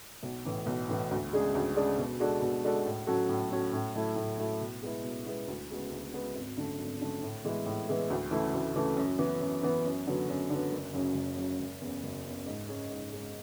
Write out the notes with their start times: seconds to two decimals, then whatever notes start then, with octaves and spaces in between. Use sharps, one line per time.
0.23 B1
0.45 A2 E3
0.66 B1
0.89 A2 E3
1.11 D2
1.32 C#3 G#3 D4 G#4
1.55 D2
1.76 C#3 G#3 D4 G#4
1.98 B2
2.20 G#3 D4 F#4 A4
2.41 B2
2.64 G#3 D4 F#4 A4
2.86 A2
3.07 F#3 C#4 F#4 A4
3.29 A2
3.50 F#3 C#4 F#4 A4
3.73 A2
3.95 F#3 A3 E4
4.16 A2
4.38 F#3 A3 E4
4.60 B2
4.82 G#3 B3 E4
5.03 B2
5.25 G#3 B3 E4
5.48 D2
5.70 C#3 G#3 B3 F#4
5.91 D2
6.12 C#3 G#3 B3 F#4
6.36 G#1
6.57 F#2 D3 A3
6.79 G#1
7.00 F#2 D3 A3
7.23 A2
7.45 E3 G#3 B3 E4
7.66 A2
7.87 E3 G#3 B3 E4
8.10 D2
8.31 C#3 E3 A3 E4
8.54 D2
8.75 C#3 E3 A3 E4
8.97 F#2
9.18 E3 B3
9.41 F#2
9.63 E3 B3
9.85 F#2
10.07 D3 F#3 B3
10.29 F#2
10.50 D3 F#3 B3
10.72 F#1
10.94 F#2 C#3 F#3
11.15 F#1
11.37 F#2 C#3 F#3
11.60 F#1
11.81 E2 C#3
12.04 F#1
12.25 E2 C#3
12.46 G#2
12.68 G#3 C#4
12.90 G#2
13.12 G#3 C#4